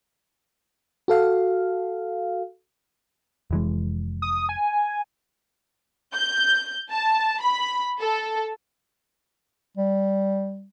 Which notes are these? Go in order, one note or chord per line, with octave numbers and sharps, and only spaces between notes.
F#4 A4 F5
F1 E3 G#3
D#6
G#5
G6
A5
B5
A4
G3